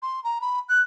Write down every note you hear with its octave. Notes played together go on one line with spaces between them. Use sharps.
C6
A#5
B5
F#6